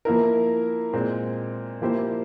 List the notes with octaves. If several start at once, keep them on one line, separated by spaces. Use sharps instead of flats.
F3 A#3 E4 A#4
A#2 G#3 C4
F3 A#3 E4 G4 C5